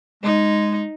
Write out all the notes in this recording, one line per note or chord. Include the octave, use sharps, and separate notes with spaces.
G#3 D#4